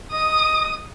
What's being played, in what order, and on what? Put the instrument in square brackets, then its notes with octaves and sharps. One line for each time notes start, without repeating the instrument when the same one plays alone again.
[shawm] D#5 [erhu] D#6